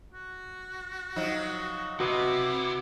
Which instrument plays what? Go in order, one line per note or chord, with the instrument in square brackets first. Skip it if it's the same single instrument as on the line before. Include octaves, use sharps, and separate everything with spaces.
[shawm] F#4
[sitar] F3 F#3 D#4
[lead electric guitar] C3 [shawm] E4 [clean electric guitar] F#4 B4 D#5